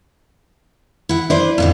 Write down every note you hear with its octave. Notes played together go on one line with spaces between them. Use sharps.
E4 F#5
D4 E4 B4 C5 D5
F2 A2 D3